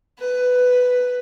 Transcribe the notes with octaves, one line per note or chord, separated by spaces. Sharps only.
B4